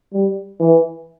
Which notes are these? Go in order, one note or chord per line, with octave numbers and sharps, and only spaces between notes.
G3
E3